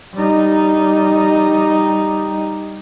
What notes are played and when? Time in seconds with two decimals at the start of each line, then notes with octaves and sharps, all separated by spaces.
0.15 G3 D#4